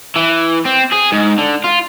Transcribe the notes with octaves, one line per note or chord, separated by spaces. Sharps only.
E3
C4
G#4
G#2
D3
F4